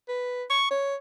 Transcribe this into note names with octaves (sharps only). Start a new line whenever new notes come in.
B4
C#6
C#5